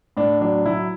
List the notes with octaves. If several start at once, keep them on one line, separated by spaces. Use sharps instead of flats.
A2 D4
F#3 D4
F#3 E4